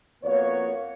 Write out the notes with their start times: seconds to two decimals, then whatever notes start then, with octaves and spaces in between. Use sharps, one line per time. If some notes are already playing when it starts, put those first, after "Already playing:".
0.24 F2 A#3 B3 F#4 C#5